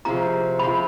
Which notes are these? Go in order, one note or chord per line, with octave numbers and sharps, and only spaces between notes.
C3 F3 G#3 C#4 A#5
C3 F3 G#3 C#4 B5